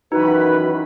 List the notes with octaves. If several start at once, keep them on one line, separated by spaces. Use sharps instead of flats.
F#2 D#3 E3 D#4 F#4 B4 B5